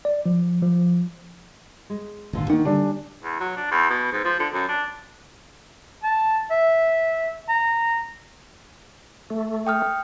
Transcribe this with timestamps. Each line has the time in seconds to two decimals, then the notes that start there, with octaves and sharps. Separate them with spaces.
0.05 D5
0.26 F3
0.62 F3
1.90 G#3
2.33 D#1 G#1 D2 A#2 D3 F4
2.50 D#3 A#3 D4 F#5
2.65 D3 G3 D4 A4 G#5
3.24 E2
3.40 F#3
3.57 D4
3.71 E2
3.90 B2
4.12 G#2
4.25 F3
4.39 D3
4.54 F#2
4.69 D4
6.03 A5
6.51 E5
7.49 A#5
9.30 A3
9.67 G5 D#6 F6